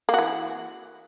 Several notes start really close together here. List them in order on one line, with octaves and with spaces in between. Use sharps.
A#3 F#4 E3